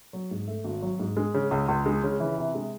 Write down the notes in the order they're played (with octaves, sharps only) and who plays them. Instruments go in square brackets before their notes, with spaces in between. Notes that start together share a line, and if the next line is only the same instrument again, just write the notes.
[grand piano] F#3
G#2
A3
G#1
F#3
G#2
G#3
C#3
C#2
C#2
G#3
C#3
E3
C3
G#3